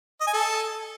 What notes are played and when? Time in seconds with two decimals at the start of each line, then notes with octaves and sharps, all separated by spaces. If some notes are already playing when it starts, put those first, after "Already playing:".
0.21 D#5
0.27 G#5
0.33 A4